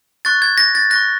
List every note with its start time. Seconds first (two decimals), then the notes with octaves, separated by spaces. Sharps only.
0.25 C#6 F#6 A6
0.42 G#6
0.58 A#6
0.75 A6
0.90 F#6 A#6
0.95 C#6